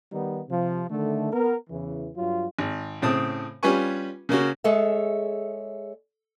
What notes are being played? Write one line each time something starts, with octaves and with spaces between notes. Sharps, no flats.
D#3 G3 B3 D#4
C3 F3
D3 D#3 A3
B3 A#4
E2 C#3 E3
G2 F#3 F4
G#1
A2 C#3 C4 A5 D#6
G3 C#4 F4 B4 G#5 C#6
C#3 A#3 C#4 F#4
G#3 G#4 A4 C#5 E5